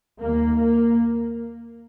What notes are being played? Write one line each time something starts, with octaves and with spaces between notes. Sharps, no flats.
D#2 A#3
A#3